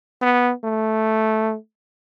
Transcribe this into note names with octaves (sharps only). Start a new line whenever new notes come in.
B3
A3